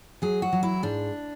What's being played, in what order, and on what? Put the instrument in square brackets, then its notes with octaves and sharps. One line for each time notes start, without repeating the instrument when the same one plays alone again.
[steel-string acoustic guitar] F#3 G#4
F#4
F#3
E4
G#2 D4